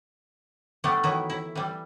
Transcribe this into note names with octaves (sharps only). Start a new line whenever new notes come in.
G3 A3 B3 D4
D#3 E3 F#3 E4
E4
E3 G3